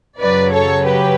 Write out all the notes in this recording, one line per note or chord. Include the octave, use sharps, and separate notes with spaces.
F#2 C#3 F#3 B4 D5
A4 C#5
G4 B4